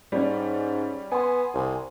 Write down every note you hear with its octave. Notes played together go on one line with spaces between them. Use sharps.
G#2 G3 C#4
B3 G#5 C6
C2